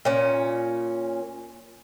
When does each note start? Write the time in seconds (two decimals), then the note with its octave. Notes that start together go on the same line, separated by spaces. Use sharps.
0.05 A#2 C#4